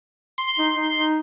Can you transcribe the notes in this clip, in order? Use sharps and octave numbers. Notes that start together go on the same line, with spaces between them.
C6
D#4
D#4
D#4